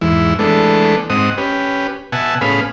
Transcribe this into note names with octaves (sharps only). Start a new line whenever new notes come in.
E2 G#2 E3 E4
E3 G#3 A3 B3 D4 A4
G#2 C4 D#5 F#5 D#6
C#4 G4 B4
B2 E5 F#5 G#5 A5
A2 B3 C#4 G#4 F5 B5